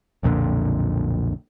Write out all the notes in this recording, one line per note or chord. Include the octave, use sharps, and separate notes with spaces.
B1 F2 A#2 D3